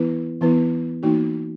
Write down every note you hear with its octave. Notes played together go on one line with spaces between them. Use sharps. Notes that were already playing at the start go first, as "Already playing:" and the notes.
Already playing: E3 B3 E4 B4
E3 B3 E4 B4
E3 A#3 D#4 F#4